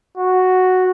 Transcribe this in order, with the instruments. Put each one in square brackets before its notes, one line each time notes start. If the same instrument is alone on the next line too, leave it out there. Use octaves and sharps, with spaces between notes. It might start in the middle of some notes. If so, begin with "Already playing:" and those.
[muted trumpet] F#4